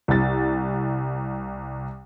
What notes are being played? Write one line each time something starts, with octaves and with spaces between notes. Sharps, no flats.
C2 A6